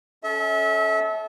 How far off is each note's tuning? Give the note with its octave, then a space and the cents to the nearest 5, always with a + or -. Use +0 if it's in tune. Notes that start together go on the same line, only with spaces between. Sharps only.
C#4 +10 A4 -25 E5 -30